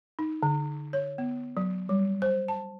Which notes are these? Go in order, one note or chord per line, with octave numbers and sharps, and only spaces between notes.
D#4
D3
C#5
B3
F#3
G3
C5
A5